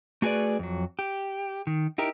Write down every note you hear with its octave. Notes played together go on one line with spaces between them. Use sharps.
A3 F#4 G#4 A4 B4 D5
F2 F#3
G4
D#3
D#4 E4 G4 A#4